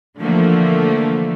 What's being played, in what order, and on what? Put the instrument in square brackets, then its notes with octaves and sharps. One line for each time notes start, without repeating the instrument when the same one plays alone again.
[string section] D3 E3 F3 A3 A#3